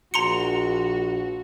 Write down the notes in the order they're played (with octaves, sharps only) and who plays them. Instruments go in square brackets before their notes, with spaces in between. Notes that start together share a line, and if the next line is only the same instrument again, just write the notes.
[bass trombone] A#1 [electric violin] F#4 [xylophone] A#5 C6 C#7